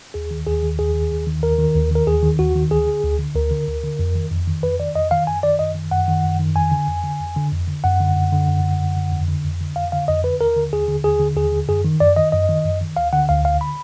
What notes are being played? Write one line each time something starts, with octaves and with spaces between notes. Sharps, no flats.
D#2 G#4
D#3
D#2 G#4
D#3
D#2 G#4
D#3
D#2
D#3
D#2 A#4
D#3
D#2
D#3 A#4
D#2 G#4
D#3
D#2 F#4
D#3
D2 G#4
D3
D2
D3
D2 A#4
D3
D2
D3
F2
D#3
F2
D#3
F2 B4
D#3 D5
F2 D#5
D#3 F5
F#2 G#5
D#3 D5
F#2 D#5
D#3
F#2 F#5
D#3
F#2
D#3
F2 G#5
D3
F2
D3
F2
D3
F2
D3
F#2 F#5
D3
F#2
D3
F#2
D3
F#2
D3
F2
D3
F2
D3
F2 F5
D3 F5
F2 D#5
D3 B4
D#2 A#4
D3
D#2 G#4
D3
D#2 G#4
D3
D#2 G#4
D3
F#2 G#4
D#3
F#2 D5
D#3 D#5
F#2 D#5
D#3
F#2
D#3
D2 F5
D3 F#5
D2 F5
D3 F5
B5